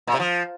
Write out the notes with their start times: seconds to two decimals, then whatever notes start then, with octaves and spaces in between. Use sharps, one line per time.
0.07 A#2
0.14 C3
0.20 F3